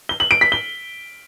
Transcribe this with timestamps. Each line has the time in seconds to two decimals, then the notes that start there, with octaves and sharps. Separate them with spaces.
0.09 G7
0.20 F#7
0.31 D7
0.41 B6
0.52 G7